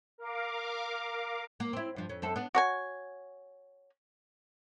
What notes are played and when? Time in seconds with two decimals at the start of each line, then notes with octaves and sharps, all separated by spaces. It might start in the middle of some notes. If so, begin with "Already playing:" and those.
0.18 A#4 F5 D6
1.60 A#3
1.73 C4 E4
1.96 G2 F3
2.09 F2 C#4
2.22 F#2 C4 A4
2.36 B3 D4
2.55 F#4 C#5 G#5